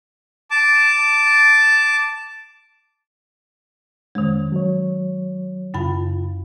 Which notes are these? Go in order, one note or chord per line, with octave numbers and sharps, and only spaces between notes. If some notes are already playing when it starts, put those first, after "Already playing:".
A5 D6
F2 D#3 G#3 C#4
F#3 C#5
F#2 C#3 F4 A5 B5